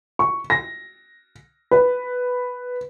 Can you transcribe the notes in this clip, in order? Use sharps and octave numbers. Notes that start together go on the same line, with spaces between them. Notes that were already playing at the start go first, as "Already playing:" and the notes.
C#6
A#6
B4